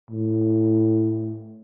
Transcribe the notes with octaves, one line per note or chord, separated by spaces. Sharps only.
A2